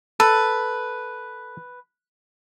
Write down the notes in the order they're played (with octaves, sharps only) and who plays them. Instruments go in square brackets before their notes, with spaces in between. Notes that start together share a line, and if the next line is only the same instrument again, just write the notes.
[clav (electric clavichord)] A4 [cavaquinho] B4